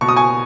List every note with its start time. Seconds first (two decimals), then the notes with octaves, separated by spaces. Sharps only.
0.01 B2 C#6
0.09 D#6
0.16 G#5 C#6